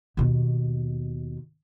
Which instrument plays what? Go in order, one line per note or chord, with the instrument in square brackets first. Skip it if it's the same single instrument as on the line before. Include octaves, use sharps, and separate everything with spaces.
[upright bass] D#2 B2